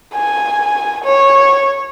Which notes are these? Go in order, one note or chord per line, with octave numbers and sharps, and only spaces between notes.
G#5
C#5